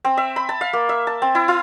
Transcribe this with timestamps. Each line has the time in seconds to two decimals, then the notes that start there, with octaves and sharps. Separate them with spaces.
0.04 C4
0.17 E5
0.36 B5
0.49 A5
0.61 F5
0.73 A#3
0.89 E5
1.07 A5
1.22 C4
1.35 E4
1.48 E4